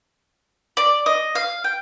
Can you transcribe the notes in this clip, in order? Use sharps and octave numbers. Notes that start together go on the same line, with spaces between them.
D5
D#5
F5
G5